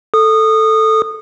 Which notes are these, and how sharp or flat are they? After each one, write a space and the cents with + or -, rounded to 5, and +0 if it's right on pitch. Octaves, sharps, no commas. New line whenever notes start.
A4 +0 D#6 -20